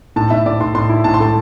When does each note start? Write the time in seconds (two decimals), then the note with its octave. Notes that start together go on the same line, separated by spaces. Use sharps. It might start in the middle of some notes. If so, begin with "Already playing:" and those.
0.16 A2 A5
0.30 A2 E5
0.46 A2 D5
0.60 A2 C6
0.75 A2 C6
0.89 E4
1.04 A2 A5
1.14 C6
1.20 A3 A5